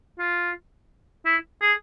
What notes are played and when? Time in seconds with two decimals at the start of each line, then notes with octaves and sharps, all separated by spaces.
0.19 F4
1.25 E4
1.62 G#4